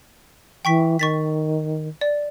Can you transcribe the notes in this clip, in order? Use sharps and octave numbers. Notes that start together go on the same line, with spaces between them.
E3 G5 C#6 B6
D#3 C#6 A6 B6
D5